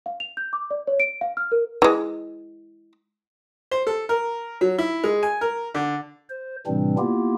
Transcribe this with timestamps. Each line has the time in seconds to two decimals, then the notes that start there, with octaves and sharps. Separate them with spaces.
0.06 F5
0.20 F7
0.37 G6
0.53 D6
0.71 D5
0.87 C#5
1.00 D7
1.21 F5
1.37 F6
1.52 A#4
1.82 E3 G#3
3.71 C5
3.87 A4
4.09 A#4
4.61 F#3
4.78 E4
5.04 G#3
5.23 G#5
5.41 A#4
5.74 D3
6.29 C5
6.67 A2 C3 E3 G3 C4 D4
6.98 A#3 B3 E4 F4 G4